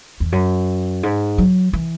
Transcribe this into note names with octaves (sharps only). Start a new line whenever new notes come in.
E2
F#2
G#2
F#3
E3